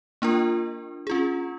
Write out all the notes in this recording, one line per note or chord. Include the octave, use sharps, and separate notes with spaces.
A#3 D4 F4 A#4
C#4 F4 G#4